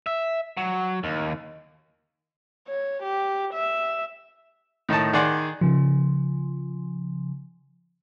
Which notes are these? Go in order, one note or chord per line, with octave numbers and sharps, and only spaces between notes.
E5
F#3
D#2
C#5
G4
E5
A2 D#3 D#4 A5
D#3 G#4 D5 F#5 C6
C#3 F3